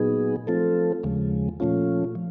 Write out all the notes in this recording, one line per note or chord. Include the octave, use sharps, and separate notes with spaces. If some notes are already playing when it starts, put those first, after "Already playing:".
Already playing: A#2 F#3 B3 D#4 G#4
F3 A3 C4 F4 A4
D#2 C#3 F3 G#3
A#2 F3 A3 C#4 F4
F3